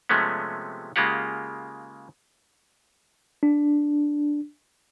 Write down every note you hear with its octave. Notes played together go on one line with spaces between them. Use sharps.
C3 F3 G#3 A3 B3 C#4
C#3 G#3 A#3 F4 G4 F#5
D4